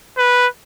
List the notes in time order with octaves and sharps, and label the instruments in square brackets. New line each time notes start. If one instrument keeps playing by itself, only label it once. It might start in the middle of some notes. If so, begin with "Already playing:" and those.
[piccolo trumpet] B4